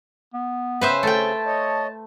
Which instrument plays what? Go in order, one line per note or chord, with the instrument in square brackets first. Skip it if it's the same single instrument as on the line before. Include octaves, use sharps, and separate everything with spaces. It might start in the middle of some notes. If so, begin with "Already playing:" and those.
[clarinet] B3
[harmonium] C#3 C4 C#4 [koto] B4 C5 E5
[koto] A3 G5 [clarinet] A5
[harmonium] C#5 D#5